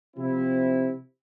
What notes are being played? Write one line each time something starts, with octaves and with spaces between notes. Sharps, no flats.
C3 F3 C4 E4